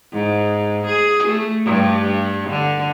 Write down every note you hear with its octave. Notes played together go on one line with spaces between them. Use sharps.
G#2
G#4
A3
G2
D3